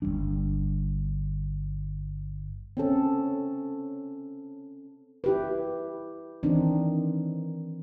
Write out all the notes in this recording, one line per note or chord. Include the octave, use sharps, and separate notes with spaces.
G1 F#2 G3 D4
C4 C#4 A4
E4 G4 B4
D#3 E3 C4 D4 D#4